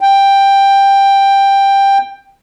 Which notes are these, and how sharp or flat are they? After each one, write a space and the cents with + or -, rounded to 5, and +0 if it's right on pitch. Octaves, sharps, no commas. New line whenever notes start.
G5 +10